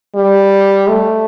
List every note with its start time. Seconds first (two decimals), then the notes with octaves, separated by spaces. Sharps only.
0.15 G3
0.88 A3